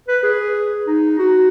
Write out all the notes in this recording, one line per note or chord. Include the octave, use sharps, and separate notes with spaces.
B4
G#4
D#4
F#4